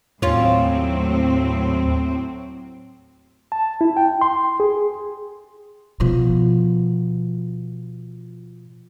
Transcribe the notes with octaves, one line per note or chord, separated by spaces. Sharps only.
D#2 A2 F#3 C4 C#4 F4
A5
E4
G5
C6
G#4
B2 F3